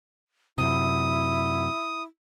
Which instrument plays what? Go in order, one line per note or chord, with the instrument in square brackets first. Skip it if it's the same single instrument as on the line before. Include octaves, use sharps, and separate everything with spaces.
[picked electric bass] F#2 C3 [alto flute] E4 [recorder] D#6